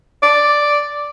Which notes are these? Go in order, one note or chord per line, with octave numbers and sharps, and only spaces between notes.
D5